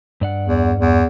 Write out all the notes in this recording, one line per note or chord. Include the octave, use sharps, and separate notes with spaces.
G2 D5 F#5
E2
E2